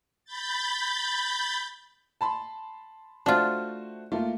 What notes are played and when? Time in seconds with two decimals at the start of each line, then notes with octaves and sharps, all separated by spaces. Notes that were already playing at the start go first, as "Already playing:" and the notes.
0.25 B5 G6 A6
2.21 A5 B5 C6
3.26 A3 D4 F4 F#4 C5
4.12 A3 A#3 F4